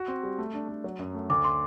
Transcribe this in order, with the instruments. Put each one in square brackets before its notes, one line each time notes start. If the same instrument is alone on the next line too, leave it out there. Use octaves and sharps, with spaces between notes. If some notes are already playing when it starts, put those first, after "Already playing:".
Already playing: [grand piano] F#4
C4
G3
A3
D4
A3
F#3
F#2
A3
[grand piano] D2 [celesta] D6
[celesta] C6